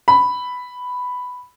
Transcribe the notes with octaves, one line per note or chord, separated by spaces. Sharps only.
B5